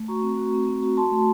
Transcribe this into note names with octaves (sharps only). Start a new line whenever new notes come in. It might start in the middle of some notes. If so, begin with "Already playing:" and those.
Already playing: A3
F#4 A#5 C#6
C4
F#4
C4
C4
F#4
F#4 A5 C6
A3